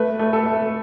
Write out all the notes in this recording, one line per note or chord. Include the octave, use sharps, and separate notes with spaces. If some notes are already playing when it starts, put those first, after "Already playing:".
Already playing: A3 B4
A3
A4
A3